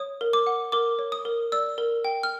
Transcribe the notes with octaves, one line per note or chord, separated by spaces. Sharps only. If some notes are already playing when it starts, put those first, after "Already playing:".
Already playing: C#5 D#6
A#4
D6
F#5
A#4 D6
C#5
D#6
A#4
D5 E6
A#4
G5
F6